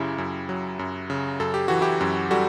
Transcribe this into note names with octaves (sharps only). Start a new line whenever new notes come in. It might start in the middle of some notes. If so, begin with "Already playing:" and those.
Already playing: F#2 C#3 E4 G4
F#2
F#3
F#2
C#3
F#2 A4
G4
E3 F#4
E4 G4
F#2
G3 F#4 A4